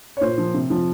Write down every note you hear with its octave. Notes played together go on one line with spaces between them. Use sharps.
C#5
A#2 C5
F3
C3
F3